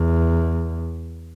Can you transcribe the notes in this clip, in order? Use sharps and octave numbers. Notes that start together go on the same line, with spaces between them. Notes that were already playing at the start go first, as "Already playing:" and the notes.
Already playing: E2